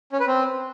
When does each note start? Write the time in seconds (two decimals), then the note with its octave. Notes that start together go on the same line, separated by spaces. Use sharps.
0.12 C#4
0.20 B4
0.27 C4